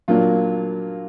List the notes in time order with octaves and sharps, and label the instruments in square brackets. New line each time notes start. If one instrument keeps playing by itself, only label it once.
[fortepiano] A#2 F#3 A#3 D4 F4